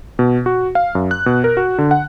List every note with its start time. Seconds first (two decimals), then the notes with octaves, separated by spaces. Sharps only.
0.19 B2
0.46 F#4
0.75 F5
0.95 F#2
1.11 F#6
1.26 B2
1.44 A#4
1.57 F#4
1.78 D3
1.91 F#5